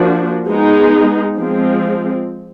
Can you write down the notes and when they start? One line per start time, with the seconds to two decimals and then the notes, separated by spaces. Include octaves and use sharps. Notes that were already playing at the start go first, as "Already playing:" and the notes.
Already playing: F3 A#3 D4 F#4
0.47 G#3 B3 D#4
1.37 F3 G#3 C4